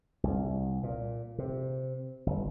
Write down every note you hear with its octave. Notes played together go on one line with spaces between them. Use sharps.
C2
A#2
C3
G1